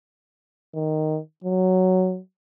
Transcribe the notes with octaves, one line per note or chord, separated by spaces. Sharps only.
D#3
F#3